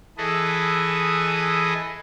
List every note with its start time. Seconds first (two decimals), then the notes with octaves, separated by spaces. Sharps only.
0.18 E3 G#4 A4 B4 D#5